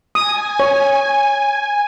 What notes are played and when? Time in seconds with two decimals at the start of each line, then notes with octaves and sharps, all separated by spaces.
0.15 G#5 D#6
0.60 C#5